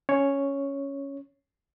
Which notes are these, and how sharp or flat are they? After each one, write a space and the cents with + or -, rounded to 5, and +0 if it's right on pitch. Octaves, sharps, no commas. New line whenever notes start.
C#4 +0 C#5 +0